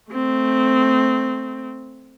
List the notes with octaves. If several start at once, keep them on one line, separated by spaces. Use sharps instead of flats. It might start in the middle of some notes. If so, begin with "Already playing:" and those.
A3 C4